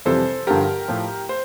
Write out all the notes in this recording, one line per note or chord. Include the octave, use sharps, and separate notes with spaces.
F2 C3 E3 G3 A4 C5
G2 D3 F3 G4 A#4
A2 F3
C5